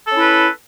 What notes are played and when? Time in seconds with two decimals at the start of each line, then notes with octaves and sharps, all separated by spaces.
0.06 A4
0.11 C#4
0.15 E4
0.20 B4